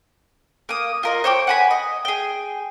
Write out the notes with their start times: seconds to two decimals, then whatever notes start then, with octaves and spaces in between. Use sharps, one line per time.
0.69 A#3 D#6
1.03 F4 A#4 D#5
1.24 C5 C#5 G5 D6
1.47 F#5 G#5 B5
1.71 D#5
2.05 G#4 G5